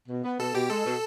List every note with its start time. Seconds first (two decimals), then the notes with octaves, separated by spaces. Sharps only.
0.09 B2
0.24 B3
0.40 B2 A4 A5
0.54 B2 G4 G5
0.69 G#3 A4 A5
0.85 B2